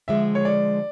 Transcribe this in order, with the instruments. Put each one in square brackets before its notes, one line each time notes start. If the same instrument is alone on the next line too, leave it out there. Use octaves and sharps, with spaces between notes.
[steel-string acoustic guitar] D3 F3 G#3 [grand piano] E5
[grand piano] C#5
D5